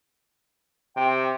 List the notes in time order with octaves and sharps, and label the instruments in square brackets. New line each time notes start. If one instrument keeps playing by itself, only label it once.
[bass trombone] C3 [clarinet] G5